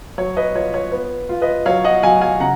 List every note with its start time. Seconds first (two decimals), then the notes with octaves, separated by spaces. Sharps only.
0.18 F#3 C#5
0.37 B4 D#5
0.55 F4 C#5
0.74 C#5
0.92 B3 B4
1.29 F4
1.41 B4 D#5
1.66 F#3 C#5 F5
1.84 D#5 F#5
2.03 F#3 F5 G#5
2.21 F5 G#5
2.40 C#3 F#5 A#5